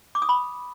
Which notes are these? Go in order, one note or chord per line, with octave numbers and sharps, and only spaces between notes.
D6
D#6
B5